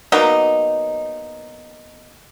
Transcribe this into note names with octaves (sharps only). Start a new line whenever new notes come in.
F#3 A#3 B3 D#4